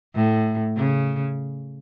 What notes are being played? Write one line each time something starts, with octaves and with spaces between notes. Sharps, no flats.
A2
C#3